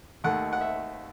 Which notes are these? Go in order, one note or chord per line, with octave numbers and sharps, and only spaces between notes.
D#2 D#3 A3 F#5
F#5
E5